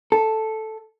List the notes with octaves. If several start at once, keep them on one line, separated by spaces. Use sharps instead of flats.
A4